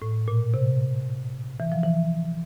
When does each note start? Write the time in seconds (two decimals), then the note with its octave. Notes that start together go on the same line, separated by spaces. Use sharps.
0.02 A2
0.28 A#2
0.54 C3
1.60 E3
1.72 F3
1.83 E3